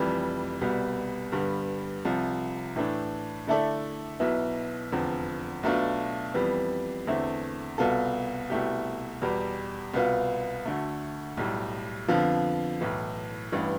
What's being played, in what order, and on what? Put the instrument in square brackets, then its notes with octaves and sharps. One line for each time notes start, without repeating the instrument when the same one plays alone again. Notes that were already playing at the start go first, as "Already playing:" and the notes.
Already playing: [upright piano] F1 F2 E3 G3
C2 B2 G3 B3
G2 D3 G3 B3
C2 C3 F3
A2 E3 A3 D4
D3 A3 E4 A4 D5
B1 B2 B3 E4
F1 E2 D3 F3 C4
B1 B2 A3 D4 F4
F2 E3 G3 B3
E2 D3 A3 C4 E4
C2 B2 B3 F4 A4
C2 B2 A3 E4 G4
E2 B2 G3
C2 B2 B3 F4
D2 D3 A3
B1 A2 G3
F2 D3 F3 B3 F4
B1 A2 E3
A1 G2 E3